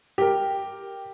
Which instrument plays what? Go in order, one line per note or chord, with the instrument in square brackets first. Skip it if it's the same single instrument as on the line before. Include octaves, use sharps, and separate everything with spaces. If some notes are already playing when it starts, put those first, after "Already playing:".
[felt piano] G4 A#4